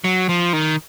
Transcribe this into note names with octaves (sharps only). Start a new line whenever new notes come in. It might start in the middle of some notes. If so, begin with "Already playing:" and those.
F#3
F3
D#3